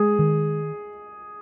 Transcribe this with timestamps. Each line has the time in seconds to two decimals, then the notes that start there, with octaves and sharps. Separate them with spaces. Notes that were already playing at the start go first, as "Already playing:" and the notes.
Already playing: G#3 G#4
0.19 D#3